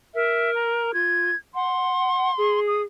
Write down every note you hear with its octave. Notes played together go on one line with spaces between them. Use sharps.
A#4 E5
A#5
F4 G#6
F#5 C6
G#4
D#6